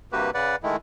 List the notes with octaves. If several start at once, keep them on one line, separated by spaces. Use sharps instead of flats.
G2 C3 A#3 F#4 G4 B4
C#3 B4 D5 F#5
D#3 G#3 A3 E4